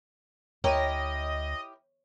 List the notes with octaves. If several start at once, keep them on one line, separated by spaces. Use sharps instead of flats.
D2 E4 G4 A#4 C#5 D#5